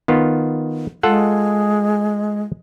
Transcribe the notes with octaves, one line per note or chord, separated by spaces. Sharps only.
D#3 B3 F4
G#3 F4 A4 F#5